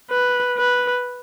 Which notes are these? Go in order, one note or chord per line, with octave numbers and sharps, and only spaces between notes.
B4
B4